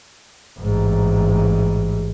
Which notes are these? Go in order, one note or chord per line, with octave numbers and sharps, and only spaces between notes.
A1 G#2